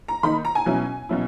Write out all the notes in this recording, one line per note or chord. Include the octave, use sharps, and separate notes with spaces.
A#5
D#3 A#3 D#4 B5
A#5
G#5
B2 F#3 C#4 E4
B2 F#3 C#4 E4